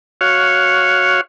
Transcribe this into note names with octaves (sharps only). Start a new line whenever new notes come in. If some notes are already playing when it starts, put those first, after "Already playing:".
F#4 C#5 F5